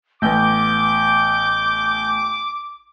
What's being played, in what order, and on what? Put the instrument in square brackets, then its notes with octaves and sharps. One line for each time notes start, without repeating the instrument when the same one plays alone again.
[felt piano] A1 B3 [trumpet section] D6 [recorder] G6